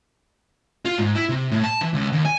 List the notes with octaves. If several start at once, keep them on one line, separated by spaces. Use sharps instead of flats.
F4
G#2
E4
C3
A2
A5
E3
C#2
D#2
G#5